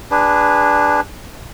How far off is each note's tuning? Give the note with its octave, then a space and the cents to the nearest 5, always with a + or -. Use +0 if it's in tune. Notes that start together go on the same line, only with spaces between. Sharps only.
D4 +0 G#4 -25 B4 +0